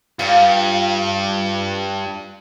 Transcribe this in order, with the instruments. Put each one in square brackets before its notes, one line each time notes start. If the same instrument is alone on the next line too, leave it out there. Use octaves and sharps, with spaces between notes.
[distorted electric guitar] G2 [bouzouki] F4 F5 A5